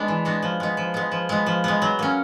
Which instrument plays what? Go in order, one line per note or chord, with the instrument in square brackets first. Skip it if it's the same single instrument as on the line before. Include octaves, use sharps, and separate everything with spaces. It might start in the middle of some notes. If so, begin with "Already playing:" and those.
Already playing: [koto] G#3 B3 D4
E3
G#3 B3 D4 F#4
F3
G#3 B3
F3
G#3 B3
F3
G#3 B3
F3
G#3 B3
F#3
A#3 C#4